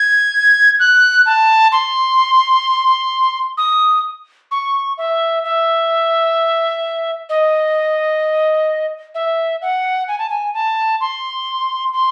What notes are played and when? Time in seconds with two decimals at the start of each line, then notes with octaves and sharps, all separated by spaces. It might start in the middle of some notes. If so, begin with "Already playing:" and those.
Already playing: G#6
0.79 F#6
1.26 A5
1.72 C6
3.58 D#6
4.51 C#6
4.98 E5
5.44 E5
7.29 D#5
9.14 E5
9.62 F#5
10.08 G#5
10.18 A5
10.29 G#5
10.54 A5
11.01 C6
11.93 C6